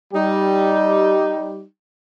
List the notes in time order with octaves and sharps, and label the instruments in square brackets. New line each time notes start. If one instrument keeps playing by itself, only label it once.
[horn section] G3 D#4 G4